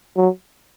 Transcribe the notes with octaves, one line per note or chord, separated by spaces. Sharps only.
F#3